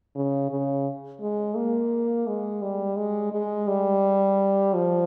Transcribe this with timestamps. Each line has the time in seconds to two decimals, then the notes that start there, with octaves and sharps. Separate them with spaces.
0.15 C#3
0.50 C#3
1.21 G#3
1.56 A#3
2.27 G#3
2.62 G3
2.98 G#3
3.32 G#3
3.68 G3
4.74 F3